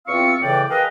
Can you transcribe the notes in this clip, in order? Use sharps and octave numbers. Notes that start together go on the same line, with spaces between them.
E2 C4 F4 F5 C#6 E6
A2 C#3 E3 D5 G5
G#4 A#4 B4 D#5 F5 G5